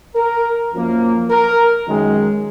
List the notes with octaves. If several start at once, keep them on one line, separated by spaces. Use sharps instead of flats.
A#4
F#2 F3 A#3
A#4
F#2 D#3 G#3